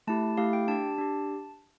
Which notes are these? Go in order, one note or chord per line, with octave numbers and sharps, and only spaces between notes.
A3 E4 G4 A5
A3 E4 G4 F5
G5
D4 G4 A5
D4 G4